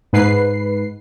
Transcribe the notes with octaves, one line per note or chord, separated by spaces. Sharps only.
G#2 B4 C7